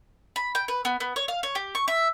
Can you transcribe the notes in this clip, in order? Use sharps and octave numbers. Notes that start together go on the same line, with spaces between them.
B5
G5
B4
B3
B3
C#5
F5
C#5
G4
C#6
E5